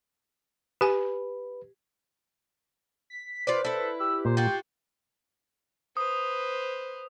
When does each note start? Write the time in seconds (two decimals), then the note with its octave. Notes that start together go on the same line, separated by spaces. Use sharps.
0.81 G4 B4 G#5
3.10 B6
3.47 F4 B4 C5 D5
3.65 E4 A4 B4
4.00 G4 E6
4.25 A#2 C5
4.37 F4 F#4 G5
5.97 B4 C5 D#6